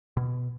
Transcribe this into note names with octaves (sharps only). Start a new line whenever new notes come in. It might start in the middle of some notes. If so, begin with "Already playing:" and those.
B2